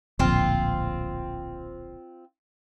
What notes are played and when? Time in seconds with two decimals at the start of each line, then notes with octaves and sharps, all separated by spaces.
0.19 D1 A#1 C4 F4